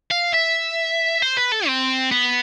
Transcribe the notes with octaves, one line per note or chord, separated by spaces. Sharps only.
F5
E5
C5
B4
A4
C4
B3